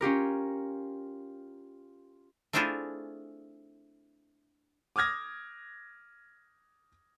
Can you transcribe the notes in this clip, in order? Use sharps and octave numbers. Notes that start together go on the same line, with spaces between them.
C#4 F4 G4 A#4
A3 C4 D4 E4 F4 G#4
D6 D#6 F6 G#6 A#6